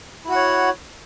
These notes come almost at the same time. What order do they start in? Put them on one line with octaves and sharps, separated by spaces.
E4 F#4 F#5 C#5